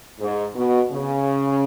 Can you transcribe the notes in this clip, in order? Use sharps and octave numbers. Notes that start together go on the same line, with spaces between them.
G#2
B2
C#3